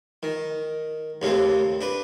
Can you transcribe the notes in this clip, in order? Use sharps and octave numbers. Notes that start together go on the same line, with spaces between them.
D#3
D#2 C#3 A3 C4
D4 B4